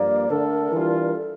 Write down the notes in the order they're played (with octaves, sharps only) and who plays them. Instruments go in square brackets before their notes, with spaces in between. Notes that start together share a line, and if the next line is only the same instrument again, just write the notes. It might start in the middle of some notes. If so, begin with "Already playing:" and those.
Already playing: [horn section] G2 F3 A#3 [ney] D5
[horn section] D3 A3 D4 A4 [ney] A#4
[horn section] E3 G3 D4 F4
[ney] A4